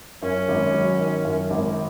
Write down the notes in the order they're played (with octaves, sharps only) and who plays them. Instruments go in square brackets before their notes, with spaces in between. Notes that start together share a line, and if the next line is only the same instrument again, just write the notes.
[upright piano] F#2 [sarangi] C#4
[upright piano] G#1
F#3
D#3
F#2
G#1